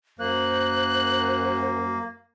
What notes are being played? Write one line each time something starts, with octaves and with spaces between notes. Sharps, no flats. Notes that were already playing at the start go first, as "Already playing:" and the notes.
F#2 A#3 C5 F#6